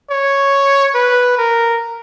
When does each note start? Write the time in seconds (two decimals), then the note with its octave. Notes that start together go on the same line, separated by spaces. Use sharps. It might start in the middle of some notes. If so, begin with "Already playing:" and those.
0.10 C#5
0.95 B4
1.38 A#4